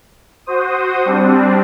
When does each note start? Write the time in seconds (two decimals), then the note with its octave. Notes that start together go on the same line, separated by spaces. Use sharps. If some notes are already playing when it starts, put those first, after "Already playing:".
0.46 F#4 C5 D#6
1.05 G3 C4 D4